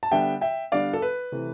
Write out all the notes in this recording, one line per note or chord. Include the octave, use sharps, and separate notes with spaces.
A5
D3 G3 B3 D4 E5 G5
E5 G5
D3 G3 B3 D4 D5 F5
A4
B4
C3 E3 A3